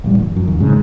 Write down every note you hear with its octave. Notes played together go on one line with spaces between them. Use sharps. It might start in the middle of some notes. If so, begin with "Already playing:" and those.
D1 A1 G3
F#1
F#2
D#2
G#2 C#3